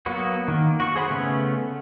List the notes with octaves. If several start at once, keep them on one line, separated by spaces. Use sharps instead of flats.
F#3 A#3 B3 F#4
D#3 A#3
F#4 C#6
G#4 C5 F#5 B5
C#3 A3 B3 C#4